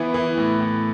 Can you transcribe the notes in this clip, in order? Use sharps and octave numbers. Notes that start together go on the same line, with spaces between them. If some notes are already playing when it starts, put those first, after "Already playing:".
Already playing: E3 B3
E3
A2
A2